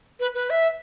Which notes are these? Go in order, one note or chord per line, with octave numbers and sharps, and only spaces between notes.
B4
B4
E5